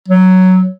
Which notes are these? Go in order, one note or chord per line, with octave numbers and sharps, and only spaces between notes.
F#3